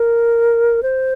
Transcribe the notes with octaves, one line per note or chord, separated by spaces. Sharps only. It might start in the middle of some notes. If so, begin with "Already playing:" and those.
Already playing: A#4
C5